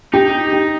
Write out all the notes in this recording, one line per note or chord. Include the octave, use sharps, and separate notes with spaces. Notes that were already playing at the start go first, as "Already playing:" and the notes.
D#4 G4
G4